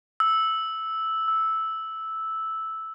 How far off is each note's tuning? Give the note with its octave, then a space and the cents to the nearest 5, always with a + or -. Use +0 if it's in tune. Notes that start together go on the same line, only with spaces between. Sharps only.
E6 -5
E6 -5